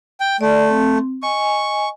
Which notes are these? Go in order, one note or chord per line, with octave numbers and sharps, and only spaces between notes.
G5
A3 D5
C4
D#5 G#5 C#6